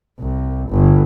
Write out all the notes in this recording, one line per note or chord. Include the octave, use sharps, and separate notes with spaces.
C2
G1